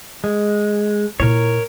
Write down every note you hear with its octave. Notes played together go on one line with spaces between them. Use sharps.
G#3
A#2 E4 A#4 C#5